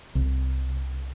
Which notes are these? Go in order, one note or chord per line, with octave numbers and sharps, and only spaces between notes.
C2